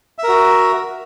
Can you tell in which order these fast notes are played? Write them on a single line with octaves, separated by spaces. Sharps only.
E5 A#4 F#4